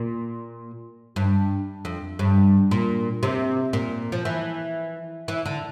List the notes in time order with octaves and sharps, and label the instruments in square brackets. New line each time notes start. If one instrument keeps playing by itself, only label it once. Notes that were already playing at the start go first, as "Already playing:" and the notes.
Already playing: [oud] A#2
G2
F2
G2
A#2
C3
A#2
F3
E3
E3
D3